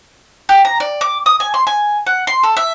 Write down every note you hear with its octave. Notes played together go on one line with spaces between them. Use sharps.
G4
A#5
D5
D6
D#6
G#5
C6
G#5
F#5
C6
A4
E5